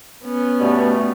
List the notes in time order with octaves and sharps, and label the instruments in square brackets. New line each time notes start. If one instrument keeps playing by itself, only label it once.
[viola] B3 C#4
[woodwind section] G2 B2 A3